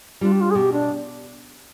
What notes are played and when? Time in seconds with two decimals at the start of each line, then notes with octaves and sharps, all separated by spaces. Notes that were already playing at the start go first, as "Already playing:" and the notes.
0.21 G3 D4 F4
0.32 G4
0.41 F4
0.50 G#4
0.55 B2 G4
0.72 D4